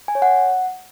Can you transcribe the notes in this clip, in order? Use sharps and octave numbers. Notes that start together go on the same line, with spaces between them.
G#5
C#5
F#5